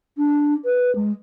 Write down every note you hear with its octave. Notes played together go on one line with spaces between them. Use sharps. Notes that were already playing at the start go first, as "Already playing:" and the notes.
D4
B4
G#3